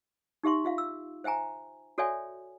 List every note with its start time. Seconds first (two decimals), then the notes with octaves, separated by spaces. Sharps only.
0.43 D#4 G4 E5 C6 C#6
0.65 F4 E5 F5
0.78 E6
1.24 C5 E5 G5 G#5 A#5
1.98 F#4 A4 C#5 D5 E5 G#5